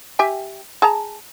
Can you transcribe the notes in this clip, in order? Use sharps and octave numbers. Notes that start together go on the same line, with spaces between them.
G4 E5 G#5
G#4 A5 A#5